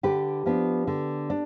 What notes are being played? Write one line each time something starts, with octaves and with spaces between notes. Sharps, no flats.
D3 G4 B4
F3 B3 D4
D3
D4